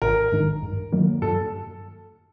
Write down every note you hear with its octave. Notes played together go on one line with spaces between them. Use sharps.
A1 A#4
G#2 D#3
G2
D#3 F#3 A#3
G2 A4